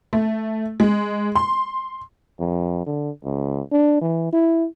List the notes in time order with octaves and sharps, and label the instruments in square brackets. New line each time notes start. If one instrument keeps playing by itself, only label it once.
[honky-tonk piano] A3
G#3
C6
[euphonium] F2
D3
C#2
D4
E3
E4